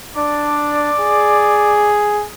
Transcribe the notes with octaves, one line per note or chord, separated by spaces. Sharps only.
D4 D5
G#4